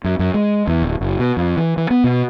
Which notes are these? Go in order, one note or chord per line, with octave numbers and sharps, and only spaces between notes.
F#2
F#2
G#3
E2
D1
F#1
B2
F2
E3
E3
B3
B2